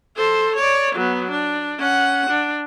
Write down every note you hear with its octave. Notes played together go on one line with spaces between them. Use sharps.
A4 C5
C#5 D5
F#3 B3
D4
C#4 F#5
D4